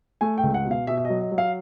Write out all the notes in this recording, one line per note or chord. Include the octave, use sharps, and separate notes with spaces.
A3 G#5
G5
C#2
F#5
B2
F5
B2 E5
E5
F#3 D#5
D#5
F#3
F5